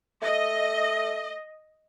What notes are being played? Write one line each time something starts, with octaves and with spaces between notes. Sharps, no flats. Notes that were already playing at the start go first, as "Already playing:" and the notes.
A3 D#5